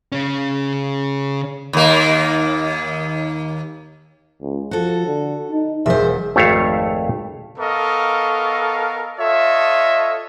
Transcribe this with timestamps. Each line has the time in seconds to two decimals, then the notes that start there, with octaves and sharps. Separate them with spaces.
0.12 C#3 C#4
1.73 D#2 A#3
4.42 C#2
4.71 F3 F#4 A4
5.07 D3
5.52 D#4
5.86 E1 F#3 A#4 C5 E5
6.36 G#1 F2 A3 C#5 E5 F5
7.59 B3 A4 A#4 D#5 F5 C#6
9.19 F4 A4 C#5 D#5 E5